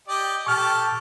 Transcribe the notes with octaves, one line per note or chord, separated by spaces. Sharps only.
G4 D5 D#5
G4 A4 C#6 F6